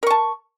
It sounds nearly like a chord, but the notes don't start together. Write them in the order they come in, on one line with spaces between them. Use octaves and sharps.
A#4 C#6 A5